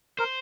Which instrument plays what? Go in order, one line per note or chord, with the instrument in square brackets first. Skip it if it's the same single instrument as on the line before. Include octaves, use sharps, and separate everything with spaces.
[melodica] A#4 [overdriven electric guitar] C5